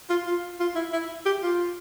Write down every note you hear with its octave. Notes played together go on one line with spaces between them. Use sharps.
F4
F4
F4
E4
E4
G4
F4